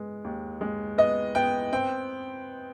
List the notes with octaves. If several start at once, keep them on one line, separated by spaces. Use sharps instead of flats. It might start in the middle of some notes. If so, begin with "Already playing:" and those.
Already playing: G#3 B3
D#2
G#3
B3 D#5
B3 G5
C4 G5